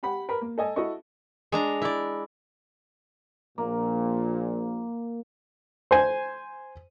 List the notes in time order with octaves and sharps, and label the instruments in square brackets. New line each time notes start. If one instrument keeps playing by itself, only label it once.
[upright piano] G4 F#5 B5
A#4 B4 B5
A#3
A4 D#5 G#5
E4 F#4 A4 D#5 C#6
[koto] G#3 D4 A#5
E4 D5
[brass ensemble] A#1 A#2 [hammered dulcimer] A#3
[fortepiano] C5 G#5